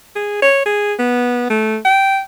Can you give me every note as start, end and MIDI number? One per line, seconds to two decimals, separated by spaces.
0.16 0.38 68
0.42 0.61 73
0.66 0.93 68
0.99 1.49 59
1.50 1.77 57
1.85 2.20 79